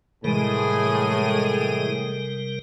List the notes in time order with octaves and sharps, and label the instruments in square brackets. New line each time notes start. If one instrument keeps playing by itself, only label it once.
[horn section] A2 [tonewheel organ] C3 G3 A#4 [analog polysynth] E3 G#3 D#7 [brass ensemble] G#4